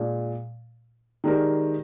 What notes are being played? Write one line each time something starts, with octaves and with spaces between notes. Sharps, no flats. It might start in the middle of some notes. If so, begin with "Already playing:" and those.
Already playing: A#2 G#3 D4
D#3 G#3 D4 G4 A#4